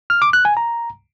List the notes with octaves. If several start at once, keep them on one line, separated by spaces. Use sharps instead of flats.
F6
D6
F#6
G#5
A#5